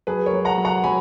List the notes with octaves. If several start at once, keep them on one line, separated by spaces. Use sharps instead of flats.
F#3 G#4 B4
A#4 C#5
F#3
F#5 A#5
F#3
F#5 A#5
F#3 G#5 B5